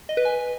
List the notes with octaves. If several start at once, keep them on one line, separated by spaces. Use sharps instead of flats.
D#5
B4
G#5